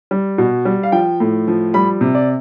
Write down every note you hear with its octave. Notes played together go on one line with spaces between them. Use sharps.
G3
B2
G3
F5
F3 G5
A2
F3
G3 B5
C3
D5